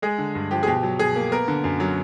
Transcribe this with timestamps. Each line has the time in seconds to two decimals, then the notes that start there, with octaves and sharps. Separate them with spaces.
0.02 G#3 G#4
0.18 D3
0.35 G2
0.51 F3 G4
0.63 G#4
0.67 B2 G4
0.83 F#3
0.99 B2 G#4
1.16 A#3
1.32 B3 A#4
1.48 D3
1.64 F#2
1.80 F#3